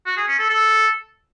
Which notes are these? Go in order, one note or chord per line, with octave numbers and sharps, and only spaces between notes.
F#4
G#4
C#4
A4
A4